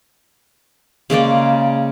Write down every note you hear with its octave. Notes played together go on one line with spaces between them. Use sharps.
C#3 G#3 A#3 D5